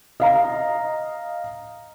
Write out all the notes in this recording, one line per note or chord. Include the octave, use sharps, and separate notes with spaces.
D#5 F5 A#5